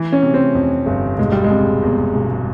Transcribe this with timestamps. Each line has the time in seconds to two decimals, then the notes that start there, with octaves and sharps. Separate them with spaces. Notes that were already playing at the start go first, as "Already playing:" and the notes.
Already playing: E3
0.12 C#4
0.22 C3
0.34 C4
0.55 F2
0.86 G1
1.18 E1 G#3
1.32 G3
1.44 G#3
1.50 C3
1.82 E2
2.14 E1